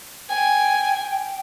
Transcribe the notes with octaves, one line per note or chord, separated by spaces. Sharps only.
G5 G#5